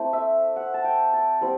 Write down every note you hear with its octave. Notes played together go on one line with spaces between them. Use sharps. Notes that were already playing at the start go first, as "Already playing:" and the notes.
Already playing: A3 C4 E4
E5
F#5
A5
G5
A5
G3 C4 E4 B5